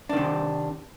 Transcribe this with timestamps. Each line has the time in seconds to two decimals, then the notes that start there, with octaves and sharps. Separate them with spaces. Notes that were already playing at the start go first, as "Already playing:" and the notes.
0.09 D4
0.13 D#3
0.16 C3